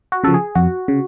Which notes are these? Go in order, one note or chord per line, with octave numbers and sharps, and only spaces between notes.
F#4
C#3 F3 A4
G#4
F2 F#4
C#3